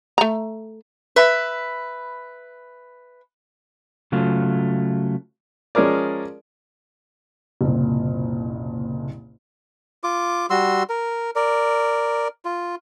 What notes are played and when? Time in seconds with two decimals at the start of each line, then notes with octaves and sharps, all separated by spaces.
0.18 A3 A#5
1.16 B4 E5 B5
4.12 C#3 F#3 A3 F4
5.75 F3 G#3 C#4 G#4 A#4 D5
7.61 F#1 C2 A#2
10.04 F4 D6
10.50 G3 F#4 C6 E6
10.89 A#4
11.36 A#4 D5
12.45 F4